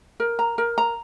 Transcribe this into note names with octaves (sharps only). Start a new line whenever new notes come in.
A#4
A#5
A#4
A#5